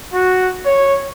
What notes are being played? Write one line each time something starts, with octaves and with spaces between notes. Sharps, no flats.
F#4
C#5